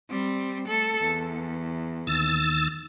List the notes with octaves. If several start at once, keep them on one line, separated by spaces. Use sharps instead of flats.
G3 C4
A3 A4
E2
D#2 E6 A6